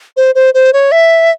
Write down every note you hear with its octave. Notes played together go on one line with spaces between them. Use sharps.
C5
C5
C5
C#5
E5